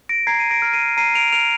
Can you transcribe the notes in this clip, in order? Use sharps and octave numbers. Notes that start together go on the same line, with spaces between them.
A#6 D7
A#5 G#6 C7
D#7
A#6 D7
F6
C7 D#7
A#5 C7 D#7
D7 F7
F6 D7 F7